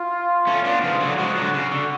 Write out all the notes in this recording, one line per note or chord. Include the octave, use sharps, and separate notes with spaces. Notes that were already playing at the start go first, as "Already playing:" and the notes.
Already playing: F4
A3 C#4
B3 D4
C#3 F3
D3 F#3
F3 G#3 F#4
D3 F#3
C#3
D3